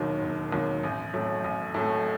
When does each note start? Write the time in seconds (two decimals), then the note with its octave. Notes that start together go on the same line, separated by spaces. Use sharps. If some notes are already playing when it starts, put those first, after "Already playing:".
Already playing: E1 D#2 D#3 F#3
0.22 E1
0.52 D#2 D#3 F#3
0.83 A1
1.13 A2 F#3 A3
1.44 A1
1.74 A2 F#3 A3